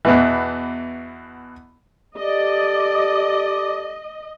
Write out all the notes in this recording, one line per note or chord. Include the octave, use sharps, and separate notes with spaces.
E2 B2 E3
G4 A4 D5 D#5